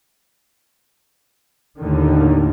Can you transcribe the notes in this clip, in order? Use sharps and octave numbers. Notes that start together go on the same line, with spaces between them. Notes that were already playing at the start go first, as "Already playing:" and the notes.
D#2 A2 D3 D#3